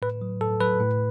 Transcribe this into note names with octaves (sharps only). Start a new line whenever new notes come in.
A2 B4
F#3
A2 A4
F#3 B4
A2